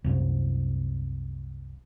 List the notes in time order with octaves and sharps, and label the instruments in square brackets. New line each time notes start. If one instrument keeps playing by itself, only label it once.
[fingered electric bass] C2 F#2 C3